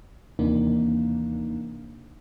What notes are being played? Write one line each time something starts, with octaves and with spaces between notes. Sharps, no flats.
D#2 C3 E3 A#3 D4 D#4